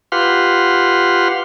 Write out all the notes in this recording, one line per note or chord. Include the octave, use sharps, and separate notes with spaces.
F4 G4 B4 F5 F#5 C6